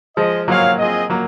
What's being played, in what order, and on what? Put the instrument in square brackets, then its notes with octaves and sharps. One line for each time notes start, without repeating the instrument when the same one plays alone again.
[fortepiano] F3 G#3 [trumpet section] F4 G#4 D#5
[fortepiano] F#3 A#3 [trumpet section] F4 G#4 C#5 F5
[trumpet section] C4 F4 G#4 D#5
[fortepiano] F#3 A#3